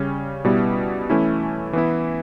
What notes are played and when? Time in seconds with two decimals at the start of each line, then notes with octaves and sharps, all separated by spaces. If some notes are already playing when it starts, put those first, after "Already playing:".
Already playing: C#3 G3 C#4
0.45 B2 G3 B3 E4
1.10 E3 A3 C#4 E4
1.73 E3 B3 E4